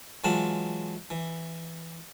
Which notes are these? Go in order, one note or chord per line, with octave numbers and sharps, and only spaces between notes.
E3 F#3 G#3 F4 F#5 A5
E3